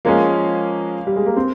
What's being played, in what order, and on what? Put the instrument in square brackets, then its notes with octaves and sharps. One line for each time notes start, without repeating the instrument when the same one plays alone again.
[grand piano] F3 G#3 C#4 G#4 [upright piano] A#3
[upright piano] G3
G#3
A#3
C4